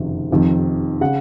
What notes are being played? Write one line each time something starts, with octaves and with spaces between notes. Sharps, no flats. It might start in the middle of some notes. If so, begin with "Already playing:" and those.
Already playing: F#1 F2 C3 D#3
F1 F2 D#3
C#3 F#5